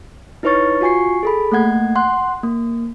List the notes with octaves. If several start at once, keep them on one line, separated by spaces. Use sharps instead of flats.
D#4 E4 B4 C#5 C#6 A6
F4 F#4 G#5 C#6 C7
G#4 A4 B5
A3 A#3 F#5 G#6
F#5 C6 F#6
A#3